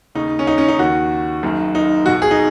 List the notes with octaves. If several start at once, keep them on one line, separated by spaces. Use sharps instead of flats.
D#2 C#3 D#4
C#4
D#4
C#4
D#4
D#2 D#3 F#4
F#1 F#2 D#3
D#4
B1 B2 F#4
G#4
D#4